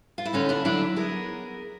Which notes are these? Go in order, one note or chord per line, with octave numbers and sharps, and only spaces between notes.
F4
E4
D3 C#4 D#4
D4 E4
F#3 D4 E4
B3 G#4 A#4